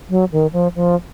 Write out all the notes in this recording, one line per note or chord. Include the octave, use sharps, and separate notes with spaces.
F#3
D#3
F3
F3